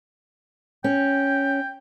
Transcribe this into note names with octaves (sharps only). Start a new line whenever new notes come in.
C#4 G5